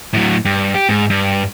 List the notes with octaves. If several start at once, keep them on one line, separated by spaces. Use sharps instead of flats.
A2 F#3
G2
G4
G#2
G2